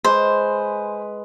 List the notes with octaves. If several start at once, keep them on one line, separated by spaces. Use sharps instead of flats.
G#3 B4 C5